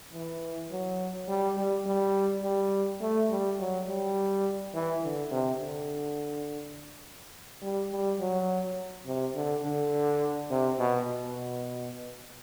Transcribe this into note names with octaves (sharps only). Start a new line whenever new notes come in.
E3
F#3
G3
G3
G3
G3
A3
G3
F#3
G3
E3
D3
C3
D3
G3
G3
F#3
C3
D3
D3
C3
B2
B2